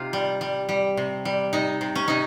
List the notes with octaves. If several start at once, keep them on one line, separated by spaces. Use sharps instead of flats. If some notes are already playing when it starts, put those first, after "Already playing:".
Already playing: C3 D#4 F4 G4
G3
G3
G3
C3
G3
C3 D#4
C3
C#4
C3 D#4